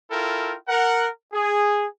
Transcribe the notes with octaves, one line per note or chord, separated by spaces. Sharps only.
E4 F4 A4 A#4 G5
A#4 F#5
G#4